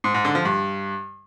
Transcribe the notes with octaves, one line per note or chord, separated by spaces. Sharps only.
G#2
G#2
D3
F3
G2